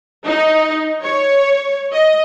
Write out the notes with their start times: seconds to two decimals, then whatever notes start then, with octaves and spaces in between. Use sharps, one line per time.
0.24 D#4
1.02 C#5
1.92 D#5